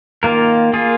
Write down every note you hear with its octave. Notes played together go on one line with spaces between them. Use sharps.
D#3 A#3 F4 A#4
A#3 F4 G#4